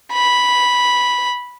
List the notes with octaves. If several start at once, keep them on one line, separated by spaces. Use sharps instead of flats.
B5